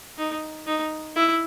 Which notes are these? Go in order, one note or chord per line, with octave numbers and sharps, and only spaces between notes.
D#4
D#4
E4